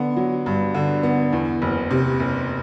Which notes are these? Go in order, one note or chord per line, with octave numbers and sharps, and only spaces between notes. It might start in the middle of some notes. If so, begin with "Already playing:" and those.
Already playing: D3 B3
F#3
G2
D3
B3
E2
F#1
C3
F#1